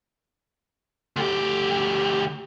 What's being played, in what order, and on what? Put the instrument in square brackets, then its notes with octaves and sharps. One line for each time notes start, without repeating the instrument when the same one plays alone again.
[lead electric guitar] D2 G4